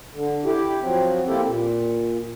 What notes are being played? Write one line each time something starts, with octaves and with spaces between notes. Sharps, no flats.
D3
E4 G4
F3 F#3 C4
A#3 C4 E4 G4 A4
A#2